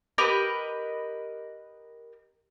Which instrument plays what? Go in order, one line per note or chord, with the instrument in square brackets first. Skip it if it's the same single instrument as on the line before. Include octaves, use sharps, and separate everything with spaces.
[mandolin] G4 A#4 B4 D#5